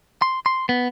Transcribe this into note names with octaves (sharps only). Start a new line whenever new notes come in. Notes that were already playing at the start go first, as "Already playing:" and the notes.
C6
C6
B3